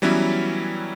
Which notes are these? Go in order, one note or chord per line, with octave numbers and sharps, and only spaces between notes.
E3 F#3 G3 B3 C#4 E4